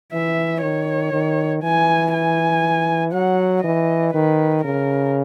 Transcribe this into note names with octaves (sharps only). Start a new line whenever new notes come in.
E3 E5
D#3 C#5
D#3
E3 G#5
G#5
F#3 F#5
E3 D#5
D#3 B4
C#3 A#4